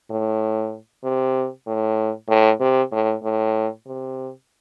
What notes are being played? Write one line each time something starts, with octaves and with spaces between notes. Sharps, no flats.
A2
C3
A2
A2
C3
A2
A2
C3